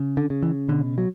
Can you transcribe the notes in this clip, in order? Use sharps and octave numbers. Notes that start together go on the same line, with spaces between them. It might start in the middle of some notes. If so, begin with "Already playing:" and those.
Already playing: C#3
D3
C#3
E3
B2 D3
F#3